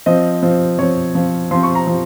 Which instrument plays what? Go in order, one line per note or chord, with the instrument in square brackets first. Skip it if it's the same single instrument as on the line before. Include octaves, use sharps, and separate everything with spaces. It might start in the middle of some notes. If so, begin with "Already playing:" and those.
[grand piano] F3 C4 D#5
F3 C4
F3 C4 C#5
F3 C4
F3 C4 C6
C#6
A#5
F3